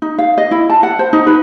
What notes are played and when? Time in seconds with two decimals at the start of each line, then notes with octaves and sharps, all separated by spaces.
0.02 D#4
0.18 F5
0.38 D#5
0.51 E4
0.70 A5
0.83 F#5
0.99 C5
1.13 D#4
1.27 B4